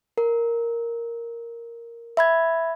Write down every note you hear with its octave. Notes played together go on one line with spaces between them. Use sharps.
A#4
E5 B5 G#6